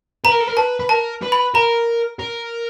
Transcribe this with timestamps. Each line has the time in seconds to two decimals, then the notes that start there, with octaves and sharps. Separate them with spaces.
0.24 B4 A#5
0.31 A#4
0.40 A4
0.47 A#4
0.57 B4 A5
0.80 B4
0.89 A#4 A5
1.22 B4
1.32 B5
1.54 A#4 A#5
2.19 A#4